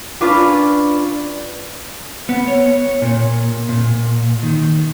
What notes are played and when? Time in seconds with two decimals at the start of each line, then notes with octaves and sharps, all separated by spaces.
0.21 C#4 D4 F4 B4
2.29 B3
2.48 C#5
3.02 A#2
3.69 A#2
4.43 D#3